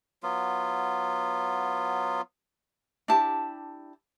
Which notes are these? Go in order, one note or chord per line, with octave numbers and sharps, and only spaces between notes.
F#3 B3 F4
D4 E4 G4 A5